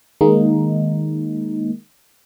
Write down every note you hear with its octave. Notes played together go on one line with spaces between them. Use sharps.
D#3 G#3 A#3 D#4